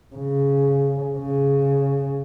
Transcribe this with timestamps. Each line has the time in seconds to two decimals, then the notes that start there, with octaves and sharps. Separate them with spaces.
0.15 C#3
1.18 C#3